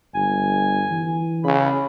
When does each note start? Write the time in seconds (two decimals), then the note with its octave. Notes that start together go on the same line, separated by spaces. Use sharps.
0.14 G1 G#5
0.91 E3
1.44 C#3 B5